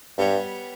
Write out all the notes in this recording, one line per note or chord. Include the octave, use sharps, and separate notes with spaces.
G2 G3 B3 G4 C#5